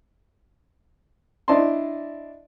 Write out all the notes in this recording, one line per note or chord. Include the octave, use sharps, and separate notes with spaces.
D4 E4 D5 D#5 A5 C6